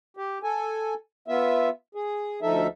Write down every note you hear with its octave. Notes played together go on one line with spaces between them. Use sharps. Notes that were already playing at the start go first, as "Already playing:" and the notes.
G4
A4 G#5
B3 F4 E5
G#4
D2 F3 D#4 A4 E5